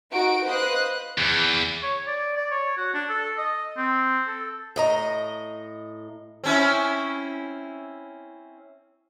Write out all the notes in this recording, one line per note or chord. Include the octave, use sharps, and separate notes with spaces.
D#4 F#4 D7
B4 C5 D#5 F5 D#6 F#6
E2
C#5
D5
D5
C#5
F#4
D4
A4
D#5
C4
A4
A2 D#5 A#5
C4 C#4 E4